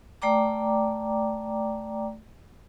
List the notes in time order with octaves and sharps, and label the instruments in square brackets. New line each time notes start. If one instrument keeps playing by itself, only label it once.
[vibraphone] A3 D5 G5 A#5 D6